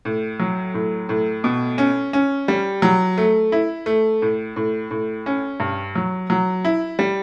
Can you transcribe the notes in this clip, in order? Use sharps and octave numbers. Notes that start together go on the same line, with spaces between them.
A2
F#3
A2
A2
B2
C#4
C#4
G3
F#3
A3
E4
A3
A2
A2
A2
C#4
G2
F#3
F#3
E4
G3